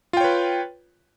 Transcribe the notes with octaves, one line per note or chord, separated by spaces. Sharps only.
F4 B4 C#5 G5